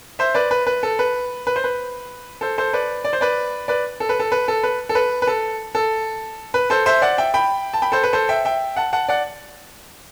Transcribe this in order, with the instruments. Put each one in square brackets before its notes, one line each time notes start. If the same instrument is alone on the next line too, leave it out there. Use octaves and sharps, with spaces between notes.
[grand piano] C5 E5
B4 D5
B4
B4
A4
B4
B4
C5
B4
A4 C5
A4 C5
B4 D5
D5
C5
B4 D5
B4 D5
A4
B4
A4
B4
A4
B4
A4
B4
B4
A4
A4
B4
A4 C5
C5 E5
D5 F#5
E5 G5
G5 B5
A5
G5 B5
A4 C5
B4
A4 C5
E5 G5
E5 G5
F#5 A5
F#5 A5
D5 F#5